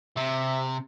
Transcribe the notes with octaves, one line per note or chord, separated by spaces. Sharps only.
C3 E5